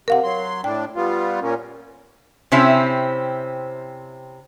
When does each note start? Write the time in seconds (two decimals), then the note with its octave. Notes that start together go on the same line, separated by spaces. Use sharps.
0.08 C3 A#4 F5 F#5
0.24 F#3 C6
0.64 A2 D4 G5
0.96 G3 B3 F4
1.42 A#2 A#3 C#4
2.52 C3 C4 C#4 E4